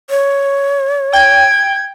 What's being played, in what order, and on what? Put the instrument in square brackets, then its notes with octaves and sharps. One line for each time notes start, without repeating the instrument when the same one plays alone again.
[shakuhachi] C#5
[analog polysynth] G5 [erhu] G#6